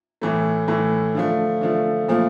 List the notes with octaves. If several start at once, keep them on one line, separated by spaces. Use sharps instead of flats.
A2 E3 A3
A2 E3 A3
D3 F3 A3
D3 F3 A3
A#2 F3 A3